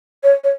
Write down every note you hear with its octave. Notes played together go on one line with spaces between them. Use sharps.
C#5
C#5